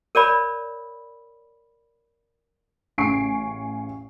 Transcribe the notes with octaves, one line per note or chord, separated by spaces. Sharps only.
A#4 C#5 D5 B5
A1 C#3 G#5 C#6 C7 D7